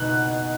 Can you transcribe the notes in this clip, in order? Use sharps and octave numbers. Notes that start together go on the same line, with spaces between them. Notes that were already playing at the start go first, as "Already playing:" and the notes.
Already playing: B2 D#4 F#6